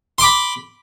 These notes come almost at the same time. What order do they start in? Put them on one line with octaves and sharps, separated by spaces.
C6 D6 B5